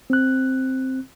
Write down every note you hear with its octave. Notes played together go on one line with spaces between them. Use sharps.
C4 F#6